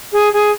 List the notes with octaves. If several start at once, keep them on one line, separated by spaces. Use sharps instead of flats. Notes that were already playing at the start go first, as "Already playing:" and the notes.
G#4
G#4